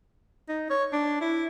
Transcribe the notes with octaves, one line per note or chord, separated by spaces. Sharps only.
D#4
C#5
D4
E4